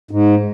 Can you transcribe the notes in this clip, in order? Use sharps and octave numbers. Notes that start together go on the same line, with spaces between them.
G#2